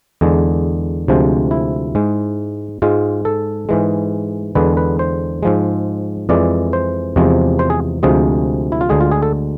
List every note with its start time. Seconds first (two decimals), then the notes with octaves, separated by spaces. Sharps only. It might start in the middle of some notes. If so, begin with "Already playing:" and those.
0.21 E2 D3 G#3
1.08 D2 C3 F3 G#3
1.51 E4
1.95 G#2 G#3
2.82 G#2 G#3 F4
3.25 A4
3.69 G#2 E3 G#3
4.55 E2 D3 G#3 B4
4.77 B4
4.99 C5
5.43 G#2 F3 G#3
6.29 F2 E3 G#3 D5
6.73 C5
7.16 E2 C3 F3 G#3
7.59 C5
7.70 G#4
8.03 D2 C3 F3 G#3 G#4
8.72 E4
8.81 F4
8.89 D2 D3 G#3 G#4
9.01 F4
9.11 G#4
9.23 A4